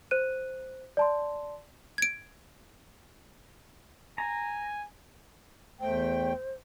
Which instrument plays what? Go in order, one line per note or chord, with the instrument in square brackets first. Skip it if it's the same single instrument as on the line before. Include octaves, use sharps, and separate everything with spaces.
[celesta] C5 F#6 D#7
D5 A5 C6
[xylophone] G#6 D7
[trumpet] G#5 [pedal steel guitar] A#5
[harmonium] E2 A3 G5 [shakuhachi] C5